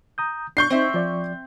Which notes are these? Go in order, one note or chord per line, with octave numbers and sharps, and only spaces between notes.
A#5 D#6 G6
D4 C#6 G6 C7
C4 D#4 C5 E5
F3 D5